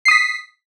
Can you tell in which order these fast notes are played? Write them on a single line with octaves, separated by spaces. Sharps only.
C7 D#6 B6